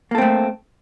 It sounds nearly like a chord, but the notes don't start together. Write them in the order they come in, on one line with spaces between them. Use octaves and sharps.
A#3 A4 C4 A3